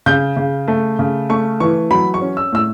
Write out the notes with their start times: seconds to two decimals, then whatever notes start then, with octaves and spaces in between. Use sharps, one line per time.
0.06 C#3 G6
0.37 C#3
0.68 A3
0.99 C#3
1.29 A3 C#6
1.60 E3 C#6
1.91 F#3 B5
2.14 C#6
2.22 C#4
2.37 E6
2.52 A2 E6